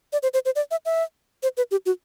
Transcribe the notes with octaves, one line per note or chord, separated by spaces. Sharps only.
D5
C5
C5
C5
D5
E5
E5
C5
B4
G4
F#4